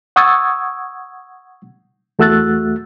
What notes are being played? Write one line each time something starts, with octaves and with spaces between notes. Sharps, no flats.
F#5 C#6 D#6 E6 G#6 A6
E2 A3 F#4 E6 F#6 A6